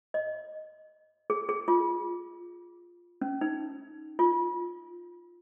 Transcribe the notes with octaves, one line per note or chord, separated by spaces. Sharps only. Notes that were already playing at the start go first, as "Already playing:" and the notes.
D#5
G#4
G#4
F4
C#4
D#4
F4